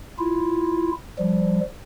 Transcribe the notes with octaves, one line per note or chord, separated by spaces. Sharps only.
E4 F4
F3 G3